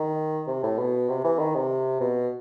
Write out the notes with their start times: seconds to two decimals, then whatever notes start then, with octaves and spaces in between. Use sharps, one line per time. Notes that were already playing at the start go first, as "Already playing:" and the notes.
Already playing: D#3
0.47 C3
0.63 A2
0.79 B2
1.09 C3
1.24 E3
1.39 D#3
1.55 C3
2.01 B2